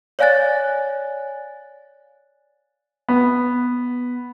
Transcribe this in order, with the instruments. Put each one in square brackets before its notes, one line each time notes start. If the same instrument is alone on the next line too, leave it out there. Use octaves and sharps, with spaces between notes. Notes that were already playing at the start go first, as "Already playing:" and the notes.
[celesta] C#5 D5 F5 G#5 F#6 A6
[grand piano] B3